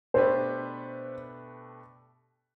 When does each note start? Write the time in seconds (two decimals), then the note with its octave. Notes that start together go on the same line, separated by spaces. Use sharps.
0.14 B2 A3 D4 G4 B4 C5